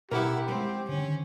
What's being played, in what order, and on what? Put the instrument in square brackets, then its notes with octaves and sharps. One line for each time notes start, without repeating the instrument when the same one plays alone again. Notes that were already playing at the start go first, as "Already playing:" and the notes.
[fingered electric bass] B2 [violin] E4 [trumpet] G4 [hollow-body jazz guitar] A#4 F#5
[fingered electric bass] G3 G#3 [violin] C4
[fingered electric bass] D3 D#3 [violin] C#4